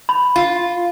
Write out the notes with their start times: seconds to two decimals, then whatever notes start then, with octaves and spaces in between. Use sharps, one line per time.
0.09 B5
0.36 F4